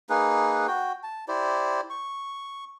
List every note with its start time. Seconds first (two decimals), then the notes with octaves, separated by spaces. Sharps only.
0.10 A#3 D#4 G#4 B4
0.68 F#4 G5
1.03 A5
1.28 E4 G4 C5 D5
1.90 C#6